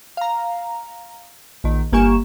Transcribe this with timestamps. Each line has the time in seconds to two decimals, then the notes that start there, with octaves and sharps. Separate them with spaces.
0.17 F5 A#5
1.64 A#1 D#3
1.92 G1 A#3 G4 G#5 C#6 E7